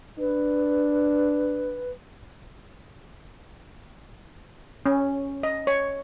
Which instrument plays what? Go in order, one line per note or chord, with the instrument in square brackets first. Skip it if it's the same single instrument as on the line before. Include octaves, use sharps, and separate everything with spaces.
[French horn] D4 [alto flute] B4
[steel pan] C#4
D#5
C#5